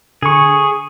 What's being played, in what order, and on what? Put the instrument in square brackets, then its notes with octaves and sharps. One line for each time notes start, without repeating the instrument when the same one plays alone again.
[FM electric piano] D3 C#6 [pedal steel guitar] G#4